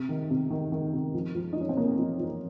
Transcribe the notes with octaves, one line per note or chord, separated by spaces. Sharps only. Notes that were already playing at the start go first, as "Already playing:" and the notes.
Already playing: C3
D#3
C3
D#3
D#3
C3
F3
F3
D#4
F3 C#4
C4
C3 A#3
F3
F3